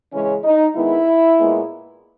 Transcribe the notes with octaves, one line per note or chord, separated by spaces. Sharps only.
C#3 E3 G#3 C#4
D#4
D#3 G#3 B3 E4
A#2 G#3 B3